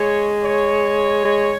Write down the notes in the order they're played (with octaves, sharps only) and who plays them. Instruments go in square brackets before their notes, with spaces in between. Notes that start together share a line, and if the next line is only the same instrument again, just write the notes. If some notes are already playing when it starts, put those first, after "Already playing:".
Already playing: [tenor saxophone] G#3 [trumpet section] C#5
[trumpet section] C#5
[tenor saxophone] G#3